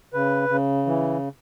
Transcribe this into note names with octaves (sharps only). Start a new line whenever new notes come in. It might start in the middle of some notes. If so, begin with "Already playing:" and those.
C#3 B4
C#3
E3